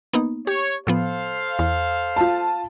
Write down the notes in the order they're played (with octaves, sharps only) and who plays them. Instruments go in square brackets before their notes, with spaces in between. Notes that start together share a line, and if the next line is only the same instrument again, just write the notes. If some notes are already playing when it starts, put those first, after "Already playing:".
[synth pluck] A#3 B3 D#4
[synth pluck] G4 [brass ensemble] C#5
[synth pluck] A2 F3 B3 [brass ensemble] A4 C5 F5
[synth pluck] E2
[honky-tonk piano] F4 A5